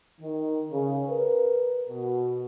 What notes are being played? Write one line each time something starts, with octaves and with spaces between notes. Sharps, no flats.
D#3
C#3
A#4 B4
B2